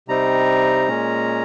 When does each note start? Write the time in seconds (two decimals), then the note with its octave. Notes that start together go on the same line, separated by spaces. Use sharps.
0.08 C3 G3 C4 D#4 A#5
0.88 A#2 G#3 C#4